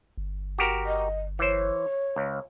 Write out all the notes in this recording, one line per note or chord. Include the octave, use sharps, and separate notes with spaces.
G1
F#4 G4 A#4
D#5
E3 C5 C#5
C#2